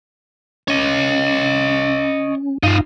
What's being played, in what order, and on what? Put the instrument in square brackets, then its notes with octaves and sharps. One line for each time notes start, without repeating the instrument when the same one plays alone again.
[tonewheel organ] C#4 [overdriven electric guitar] C#5 D#5
[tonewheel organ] G2 F5 [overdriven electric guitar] D#4 F4